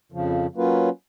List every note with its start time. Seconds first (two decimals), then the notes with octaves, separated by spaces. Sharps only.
0.12 F2 C#3 F3
0.55 F#3 A#3 C#4 F4 B4